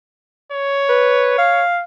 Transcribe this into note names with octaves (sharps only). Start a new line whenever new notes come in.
C#5
B4
F5